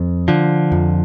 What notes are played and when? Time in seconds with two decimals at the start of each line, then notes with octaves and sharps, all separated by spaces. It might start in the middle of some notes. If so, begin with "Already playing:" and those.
Already playing: F2
0.28 D3 F3
0.72 F2